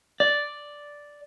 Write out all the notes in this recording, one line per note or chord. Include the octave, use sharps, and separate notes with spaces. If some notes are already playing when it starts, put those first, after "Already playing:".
D5